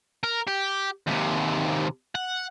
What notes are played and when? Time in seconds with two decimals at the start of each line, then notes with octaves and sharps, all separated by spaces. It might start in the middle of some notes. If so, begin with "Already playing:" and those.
0.24 A#4
0.48 G4
1.07 D#2 C3
2.15 F#5